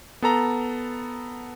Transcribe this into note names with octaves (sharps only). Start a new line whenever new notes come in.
B3 A4 A#5